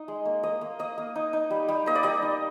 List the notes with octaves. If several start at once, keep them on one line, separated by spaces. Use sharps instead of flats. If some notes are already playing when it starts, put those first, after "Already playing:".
Already playing: D#4
G#3
A#3
A#3 D#5
A#3
A#3 D#5
A#3
D#4
D#4
G3
G3
A#3 D#5
D5
G3 D#5
D#4